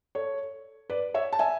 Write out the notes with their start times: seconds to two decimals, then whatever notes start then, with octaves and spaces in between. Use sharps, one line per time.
0.15 A4 C#5
0.90 B4 D5
1.14 C#5 E5
1.33 A5
1.39 E5 G#5